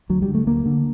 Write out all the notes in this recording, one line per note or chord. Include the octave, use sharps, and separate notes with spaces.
D2 F#3
G3
D3
A3
D2 A#3
D3